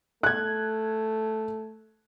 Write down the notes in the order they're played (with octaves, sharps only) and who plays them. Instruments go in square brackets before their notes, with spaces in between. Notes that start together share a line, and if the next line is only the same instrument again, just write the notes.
[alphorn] A3 [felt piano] F#6 G#6